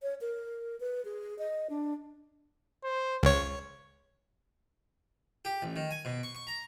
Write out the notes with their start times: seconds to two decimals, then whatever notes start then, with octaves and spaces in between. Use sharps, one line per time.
0.02 C#5
0.21 A#4
0.80 B4
1.05 G#4
1.39 D#5
1.70 D4
2.84 C5
3.23 C#2 C#5
5.45 G4
5.62 A1
5.76 D#3
5.91 G#5
6.05 B2
6.23 C#6
6.35 C#6
6.47 A#5